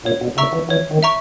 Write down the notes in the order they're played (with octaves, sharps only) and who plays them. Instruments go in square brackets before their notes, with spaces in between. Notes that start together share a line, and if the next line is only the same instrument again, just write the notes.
[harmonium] A#2 [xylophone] C#5
[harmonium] B2
[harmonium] C#3 [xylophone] E5 A#5 C#6 E6
[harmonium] E3
[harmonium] E3 [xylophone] C#5
[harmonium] D#3
[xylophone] E5 A#5 C#6